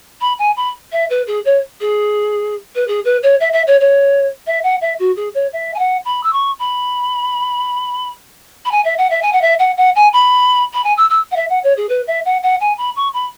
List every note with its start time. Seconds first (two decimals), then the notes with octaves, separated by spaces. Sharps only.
0.20 B5
0.38 G#5
0.56 B5
0.92 E5
1.09 B4
1.26 G#4
1.45 C#5
1.80 G#4
2.75 B4
2.87 G#4
3.04 B4
3.22 C#5
3.40 E5
3.52 E5
3.67 C#5
3.80 C#5
4.46 E5
4.63 F#5
4.81 E5
4.99 F#4
5.16 G#4
5.34 C#5
5.52 E5
5.74 G#5
5.78 F#5
6.04 B5
6.23 E6
6.32 C#6
6.59 B5
8.65 B5
8.71 G#5
8.84 E5
8.97 F#5
9.10 E5
9.22 G#5
9.32 F#5
9.41 E5
9.59 F#5
9.77 F#5
9.95 G#5
10.13 B5
10.73 B5
10.83 G#5
10.97 E6
11.09 E6
11.31 F#5
11.35 E5
11.49 F#5
11.63 C#5
11.76 G#4
11.89 B4
12.07 E5
12.25 F#5
12.42 F#5
12.60 G#5
12.77 B5
12.95 C#6
13.13 B5